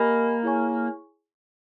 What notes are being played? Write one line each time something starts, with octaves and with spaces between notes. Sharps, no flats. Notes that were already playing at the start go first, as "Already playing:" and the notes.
Already playing: A#3 G4 A#4 D#5 G#5 B5
E4 G#4 C#5 G#5 C#6